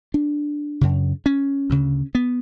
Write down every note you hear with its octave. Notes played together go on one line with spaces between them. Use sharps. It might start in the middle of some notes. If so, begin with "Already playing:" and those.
D4
F#2 C#3
C#4
D2 C#3
B3